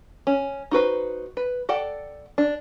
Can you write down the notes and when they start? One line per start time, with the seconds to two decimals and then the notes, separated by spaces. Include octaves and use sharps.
0.27 C#4
0.71 D#4 F#4 B4 C5
1.37 B4
1.69 A4 D5 F#5 G5
2.38 D4